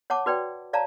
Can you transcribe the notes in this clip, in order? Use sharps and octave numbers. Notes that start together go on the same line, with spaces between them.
C#5 F#5 A5 D6
F#4 B4 D5 G5
C#5 D5 F5 A5 A#5